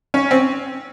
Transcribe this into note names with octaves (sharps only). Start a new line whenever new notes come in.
C#4
C4